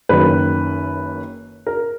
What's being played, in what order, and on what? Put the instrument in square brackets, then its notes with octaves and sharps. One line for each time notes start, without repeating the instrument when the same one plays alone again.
[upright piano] F#1 F#2 D#3 B4
A#4